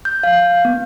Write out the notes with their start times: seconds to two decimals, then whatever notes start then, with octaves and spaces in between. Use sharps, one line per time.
0.05 G6
0.23 F5
0.65 B3